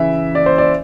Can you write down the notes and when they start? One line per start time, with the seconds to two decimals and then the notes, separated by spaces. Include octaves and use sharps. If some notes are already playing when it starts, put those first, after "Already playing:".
Already playing: C#3 E3 E5
0.35 D5
0.46 C5
0.58 D5